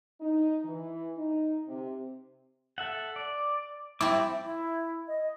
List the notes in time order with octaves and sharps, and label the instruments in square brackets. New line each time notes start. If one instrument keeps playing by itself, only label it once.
[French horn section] D#4
E3
D#4
C3
[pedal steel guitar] A4 E5 F#5
D5
[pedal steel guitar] G3 A5 D6 [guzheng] C4 E4
[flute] E4
D#5